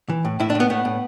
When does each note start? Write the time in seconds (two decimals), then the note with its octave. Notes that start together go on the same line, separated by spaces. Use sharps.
0.09 E3
0.25 A2
0.40 A2 E4
0.50 D4
0.55 A2 B3
0.70 A2 B3
0.85 A2